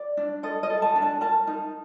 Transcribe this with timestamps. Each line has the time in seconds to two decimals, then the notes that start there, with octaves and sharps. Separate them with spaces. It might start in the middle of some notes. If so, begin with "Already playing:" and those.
Already playing: D5
0.17 D4
0.43 A4 D#5
0.63 D#5
0.70 A4
0.82 A5
0.96 D4
1.02 A5
1.21 A#4 A5
1.47 D#4